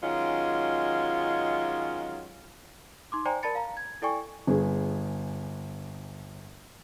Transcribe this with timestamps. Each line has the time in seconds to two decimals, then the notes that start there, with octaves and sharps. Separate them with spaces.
0.02 D#3 F#3 G#3 C#4 F4
3.12 D#4 C6 D6
3.25 C5 D5 G5 G#5 A#5
3.43 A#4 D5 A5 B5 A6 C#7
3.55 F5 A#5
3.77 G#6
4.02 E4 A4 D5 G5 G#5 C#6
4.47 G1 G#4